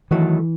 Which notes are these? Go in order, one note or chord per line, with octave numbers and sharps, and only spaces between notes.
D#3 E3 F#3 A3